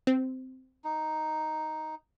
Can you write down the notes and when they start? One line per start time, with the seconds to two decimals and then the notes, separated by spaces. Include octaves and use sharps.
0.07 C4
0.84 D#4